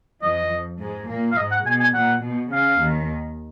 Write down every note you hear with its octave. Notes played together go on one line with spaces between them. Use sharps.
F2 F3 D#5
G#2 G#3
A#2 A#3
F5
G#2 G#3 D#5
F#5
B2 G#5
G#5
A#2 F#5
B2
C#3 F5
D#2 D#3